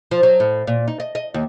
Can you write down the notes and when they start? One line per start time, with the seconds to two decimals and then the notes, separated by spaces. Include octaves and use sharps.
0.11 F3
0.23 F#3
0.40 A2
0.67 A#2
0.88 D#4
1.00 D#5
1.15 D#5
1.34 D#2